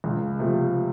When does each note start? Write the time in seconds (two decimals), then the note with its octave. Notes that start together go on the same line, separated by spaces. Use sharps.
0.04 C#2
0.39 C3 F3 A3